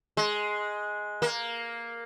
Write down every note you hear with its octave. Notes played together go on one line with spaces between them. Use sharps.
G#3
A#3